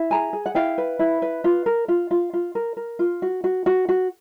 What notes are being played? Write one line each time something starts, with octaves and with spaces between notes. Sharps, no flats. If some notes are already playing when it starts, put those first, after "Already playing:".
Already playing: E4
G#4 G#5 A#5
G#4
F#5
E4 F5 G5
B4
E4
B4
F4
A#4
F4
F4
F4
A#4
A#4
F4
F#4
F#4
F#4
F#4